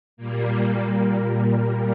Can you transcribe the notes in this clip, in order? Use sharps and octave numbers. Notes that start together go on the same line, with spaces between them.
A#2 G3 A#3